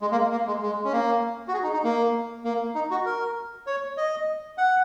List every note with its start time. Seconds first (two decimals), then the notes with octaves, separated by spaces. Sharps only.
0.01 G#3
0.12 A#3
0.32 A#3
0.47 G#3
0.62 G#3
0.84 C#4
0.92 A#3
1.48 F#4
1.54 G#4
1.63 D#4
1.73 D#4
1.84 A#3
2.44 A#3
2.75 D#4
2.91 F#4
3.06 A#4
3.67 C#5
3.97 D#5
4.58 F#5